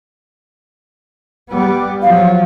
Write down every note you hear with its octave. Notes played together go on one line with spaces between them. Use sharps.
G3 B3
F3 F#3 F5